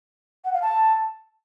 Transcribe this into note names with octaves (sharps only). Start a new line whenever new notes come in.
F#5
F5
A5